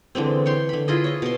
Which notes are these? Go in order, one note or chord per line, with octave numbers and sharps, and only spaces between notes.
D3 E3 G#3 C4
C#5 G5 C6
D3 B5
E4 F4 G#4 D#5
C#5 D#5
B2 C6